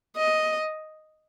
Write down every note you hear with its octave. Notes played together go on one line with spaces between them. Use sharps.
D#5